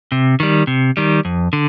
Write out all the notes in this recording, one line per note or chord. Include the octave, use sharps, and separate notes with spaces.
C3
D#3 G3
C3
D#3 G3
F2
D3